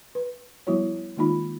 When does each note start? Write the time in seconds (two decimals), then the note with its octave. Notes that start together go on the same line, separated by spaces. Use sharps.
0.15 B4
0.67 F3 G3 B3 E4 F#4 C#5
1.17 D#3 G#3 A#3 D#4 F4 B5